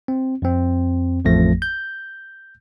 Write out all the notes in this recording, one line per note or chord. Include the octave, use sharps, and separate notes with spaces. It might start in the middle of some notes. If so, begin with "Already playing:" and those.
C4
F2 C4
A1 F2 F3 A3 A#6
G6